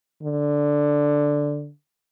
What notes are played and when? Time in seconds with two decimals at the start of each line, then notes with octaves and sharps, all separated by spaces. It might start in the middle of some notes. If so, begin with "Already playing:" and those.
0.23 D3